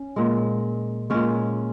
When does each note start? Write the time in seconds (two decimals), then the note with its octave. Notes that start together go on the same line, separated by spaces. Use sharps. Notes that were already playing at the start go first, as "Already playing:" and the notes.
Already playing: C#4
0.16 A#2 G#3
1.10 A#2 G#3 C#4